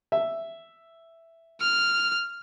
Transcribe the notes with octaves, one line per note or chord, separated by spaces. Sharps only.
E5
F6